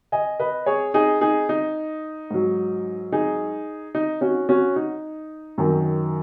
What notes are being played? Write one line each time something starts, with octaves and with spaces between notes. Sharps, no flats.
D#5 G#5
B4 D#5
G#4 C#5
D#4 G#4
D#4 G#4
D#4
G#2 F#3
D#4 G#4
D#4
C#4 F#4
C#4 F#4
D#4
F#2 D#3 F#3